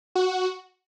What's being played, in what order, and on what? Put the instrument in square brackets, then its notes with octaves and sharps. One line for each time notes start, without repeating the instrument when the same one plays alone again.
[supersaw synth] F#4